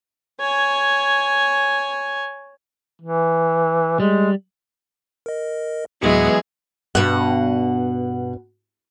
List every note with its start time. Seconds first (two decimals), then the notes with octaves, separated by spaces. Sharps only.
0.40 C#5 G#5
3.02 E3
4.00 G3 G#3
5.26 A#4 D#5
6.02 D2 A2 E3 F#3 G#3 B3 G#4 C#7
6.95 G2 B2 F#5